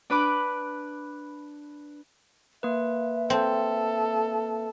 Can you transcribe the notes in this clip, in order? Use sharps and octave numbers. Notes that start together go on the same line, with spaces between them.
D4 B4 B5 D6
A#3 B4 E5
C4 A4